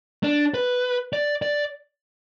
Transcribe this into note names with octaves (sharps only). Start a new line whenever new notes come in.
D4
B4
D5
D5